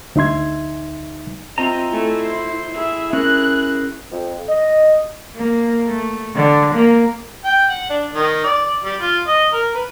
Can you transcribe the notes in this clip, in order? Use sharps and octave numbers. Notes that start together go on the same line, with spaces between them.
D2 D#4 E5 C6 G#6
C4 F4 D#5 E5 A#5
A3 E4 G#5
C5
E4 G#4 E5
C#4 A#4 F#6
F2
D#5
A#3
A3
D3
A#3
G5
F#5
D4
D#3
D5
G3
F4
D#5
A#4
B4